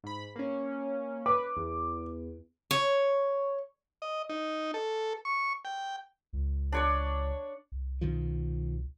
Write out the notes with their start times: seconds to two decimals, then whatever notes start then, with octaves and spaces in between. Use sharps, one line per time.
0.04 G#2 B5
0.36 A#3 C#4
1.26 B4 D6
1.57 E2
2.71 C#5
4.02 D#5
4.29 D#4
4.74 A4
5.25 C#6
5.65 G5
6.33 C#2
6.72 D4 C#5 D5
7.72 C2
8.01 B2 D#3 F3